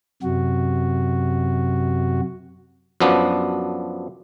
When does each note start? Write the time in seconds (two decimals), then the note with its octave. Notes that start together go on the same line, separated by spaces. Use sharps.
0.23 F#2 C3 F#4
3.00 F#2 F3 B3 D4